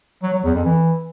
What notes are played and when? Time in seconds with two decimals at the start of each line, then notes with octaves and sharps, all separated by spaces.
0.23 F#3
0.34 F#3
0.44 E2
0.54 F2
0.65 E3